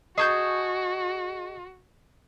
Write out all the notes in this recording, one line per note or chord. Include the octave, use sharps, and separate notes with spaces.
F#4 G#4 D#5 A5 C#6 G6 G#6